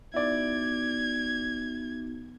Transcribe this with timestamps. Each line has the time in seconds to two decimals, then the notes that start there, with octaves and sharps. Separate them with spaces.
0.14 B3 D#4 E4 F#4 D5 G#6